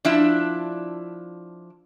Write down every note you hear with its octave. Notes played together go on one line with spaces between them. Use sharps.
F3 D4 E4